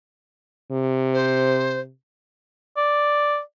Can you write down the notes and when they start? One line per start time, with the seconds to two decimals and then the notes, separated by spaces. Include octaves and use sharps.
0.72 C3
1.13 C5
2.77 D5